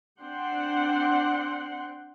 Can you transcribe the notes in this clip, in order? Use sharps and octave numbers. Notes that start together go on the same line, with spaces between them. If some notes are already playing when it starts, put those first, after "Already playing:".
C4 D4 F#5 G5 C6